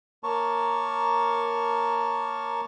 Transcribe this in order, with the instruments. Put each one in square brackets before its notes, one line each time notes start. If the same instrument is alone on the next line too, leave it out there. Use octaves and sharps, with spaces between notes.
[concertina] A#3 A#4 C#5 A5 C#6